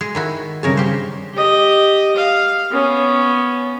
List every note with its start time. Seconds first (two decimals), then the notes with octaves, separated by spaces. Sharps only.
0.01 G#3 G#4
0.15 D#3 E4 F#4
0.63 G2 C#3 G#4 A#4 C#5 A5
0.77 G4 C5
1.34 G4 D#5
2.16 F5
2.71 B3 C#4